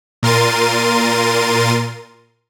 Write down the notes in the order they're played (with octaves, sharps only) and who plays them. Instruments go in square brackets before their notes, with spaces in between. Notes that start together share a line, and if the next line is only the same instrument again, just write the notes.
[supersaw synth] A#2 A#4 C6 A6 D#7